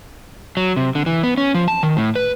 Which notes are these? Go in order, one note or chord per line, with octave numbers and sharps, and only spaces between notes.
F#3
C3
D3
E3
B3
C#4
F3
A5
D#3
A2
B4